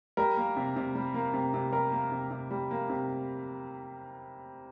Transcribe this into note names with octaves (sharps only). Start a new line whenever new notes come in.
G3 A#4
A#3
C3
C3
G3
A#3
C3
C3
G3 A#4
A#3
C3
C3
G3
A#3
C3